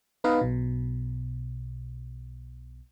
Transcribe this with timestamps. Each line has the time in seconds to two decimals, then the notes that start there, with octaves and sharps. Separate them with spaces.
0.24 B3 D#4 B4 D#5 F5
0.41 B1 B2